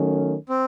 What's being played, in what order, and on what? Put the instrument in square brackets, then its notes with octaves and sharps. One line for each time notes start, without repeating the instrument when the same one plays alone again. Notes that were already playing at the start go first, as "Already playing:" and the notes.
Already playing: [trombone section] D#3 F#3 A3 C#4
[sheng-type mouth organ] C4